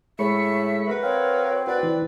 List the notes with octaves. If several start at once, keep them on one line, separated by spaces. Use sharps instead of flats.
A2 G#3 E5 B5 C#6
F#4 A#4 B4
C4 C#5 F5
F#4 B4 D5
E3